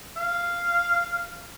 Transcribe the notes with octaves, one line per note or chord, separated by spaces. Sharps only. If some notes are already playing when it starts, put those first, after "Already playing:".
F5